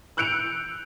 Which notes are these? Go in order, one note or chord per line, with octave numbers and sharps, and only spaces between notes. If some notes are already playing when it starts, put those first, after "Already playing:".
E6 F#6 G6 C#7 D7 F7